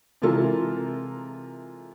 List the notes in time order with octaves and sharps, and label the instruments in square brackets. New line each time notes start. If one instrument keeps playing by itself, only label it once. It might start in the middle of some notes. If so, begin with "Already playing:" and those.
[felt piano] C3 E3 G#3 F4 A4 A#4